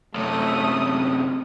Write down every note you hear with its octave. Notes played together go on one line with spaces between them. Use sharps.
F#2 C3 A3 D#6